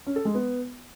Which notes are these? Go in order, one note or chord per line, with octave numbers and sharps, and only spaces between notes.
C#4
A4
G#3
B3